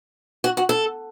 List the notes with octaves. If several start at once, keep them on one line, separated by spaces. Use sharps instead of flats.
F#4
F#4
A4